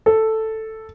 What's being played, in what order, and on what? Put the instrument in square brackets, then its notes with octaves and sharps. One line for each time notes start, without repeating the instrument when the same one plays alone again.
[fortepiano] A4